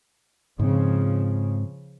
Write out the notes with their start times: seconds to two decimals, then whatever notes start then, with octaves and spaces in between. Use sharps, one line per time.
0.59 G#2 C#3 F3 C4